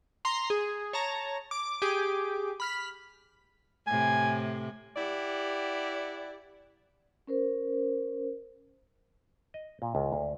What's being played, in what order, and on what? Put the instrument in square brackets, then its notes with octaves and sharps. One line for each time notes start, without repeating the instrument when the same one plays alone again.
[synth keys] A#5 C6
G#4
C#5 A5 A#5
D6
G4 G#4 D6
B5 F6 B6
[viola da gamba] A2 C3 [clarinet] G#5
[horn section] E4 G4 D5 F#5
[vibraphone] C#4 A#4 C5
[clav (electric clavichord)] D#5
A#2
C#2
D2